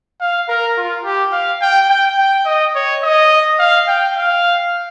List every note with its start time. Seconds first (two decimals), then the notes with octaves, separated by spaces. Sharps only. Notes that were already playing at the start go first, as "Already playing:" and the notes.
0.20 F5
0.48 A#4
0.77 F4
1.04 G4
1.32 F5
1.62 G5
1.89 G5
2.18 G5
2.46 D#5
2.75 C#5
3.03 D#5
3.59 F5
3.88 G5
4.17 F5